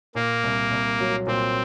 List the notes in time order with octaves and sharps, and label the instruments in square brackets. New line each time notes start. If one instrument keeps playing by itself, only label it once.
[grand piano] A#2 [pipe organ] A#3
[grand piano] C2
C2
F#3
[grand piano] A#2 [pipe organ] C4